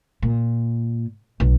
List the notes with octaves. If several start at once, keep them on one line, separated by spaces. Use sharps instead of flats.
A#2
B1